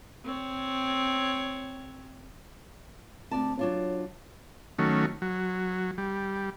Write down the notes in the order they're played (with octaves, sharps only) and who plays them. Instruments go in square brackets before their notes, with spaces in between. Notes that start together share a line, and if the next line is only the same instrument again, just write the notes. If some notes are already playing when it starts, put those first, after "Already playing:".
[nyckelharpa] C4 C#5
[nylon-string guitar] D2 D5 A5 [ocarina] C4
[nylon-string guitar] F#3 D4 F4 [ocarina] C#5
[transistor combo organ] D#3 F#3 A3 C#4
F#3
G3